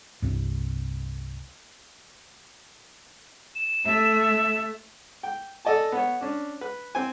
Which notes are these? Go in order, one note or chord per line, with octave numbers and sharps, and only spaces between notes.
C2 G2
E7
A3 E5
E7
G5
A4 D5 D#5 G#5 A5
B3 C#5
C#4 D4
B4
C4 G5 G#5